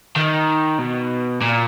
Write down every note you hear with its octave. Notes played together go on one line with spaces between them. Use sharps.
D#3
B2
A#2